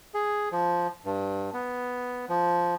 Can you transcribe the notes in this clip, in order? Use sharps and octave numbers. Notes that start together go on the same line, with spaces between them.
G#4
F3
G2
B3
F3